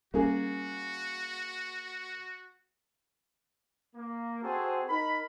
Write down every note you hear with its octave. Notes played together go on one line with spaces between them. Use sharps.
G3 A#3 C#4 F#4 G#4
A#3
C4 F#4 G#4 A4 C5
D#4 A#4 B5